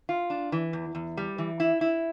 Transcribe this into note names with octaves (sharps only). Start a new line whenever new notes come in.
F4
D4
E3
E2
E2
G3
E3
E4
E4